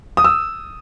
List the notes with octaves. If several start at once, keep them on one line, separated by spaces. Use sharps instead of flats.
D#6
E6